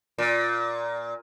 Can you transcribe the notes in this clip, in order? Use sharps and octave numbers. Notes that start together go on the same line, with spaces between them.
A#2